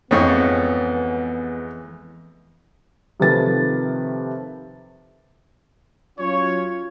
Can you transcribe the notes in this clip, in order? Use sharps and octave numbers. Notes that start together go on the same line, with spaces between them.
F2 G#2 E3 G#3 B3 C#5
C3 D#3 F3 A3 B4 A6
F#3 C#4 F4 C#5